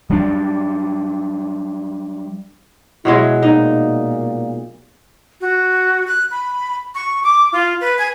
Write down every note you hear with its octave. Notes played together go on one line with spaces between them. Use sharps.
F#3 G3 D4
B2 F#3 G#3 E4
A#2 D#4
F#4
F#6
B5
C#6
D6
F4
B4
G#5